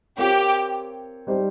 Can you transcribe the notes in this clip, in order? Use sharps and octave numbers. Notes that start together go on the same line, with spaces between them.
C4 F4 G4 A#4 C#5
G3 C4 D#4 G4 C5